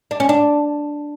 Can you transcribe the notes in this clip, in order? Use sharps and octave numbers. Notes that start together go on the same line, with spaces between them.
D4
C#4
D4